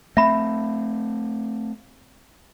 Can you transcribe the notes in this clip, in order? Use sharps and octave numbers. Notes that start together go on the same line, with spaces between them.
A3 C4 E5 B5